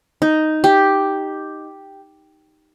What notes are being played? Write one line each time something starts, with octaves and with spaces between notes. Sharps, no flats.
D#4
G4